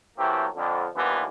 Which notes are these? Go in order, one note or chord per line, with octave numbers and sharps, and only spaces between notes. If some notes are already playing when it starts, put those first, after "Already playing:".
E3 F#3 A3 A#3 C4 G4
F2 D3
D#2 D3 E3 F3 G3 B3